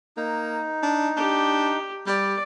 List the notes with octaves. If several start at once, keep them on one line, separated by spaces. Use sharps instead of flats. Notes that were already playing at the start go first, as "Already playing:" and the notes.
A#3 D#4
D4
D4 G4
G3 D5